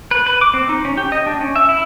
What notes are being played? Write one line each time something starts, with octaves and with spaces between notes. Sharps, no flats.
B4
B4
D6
C4
D#4
C#4
G4
D#5
D4
C#4
E5
E4